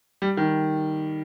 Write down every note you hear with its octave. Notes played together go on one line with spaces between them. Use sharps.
G3
D#3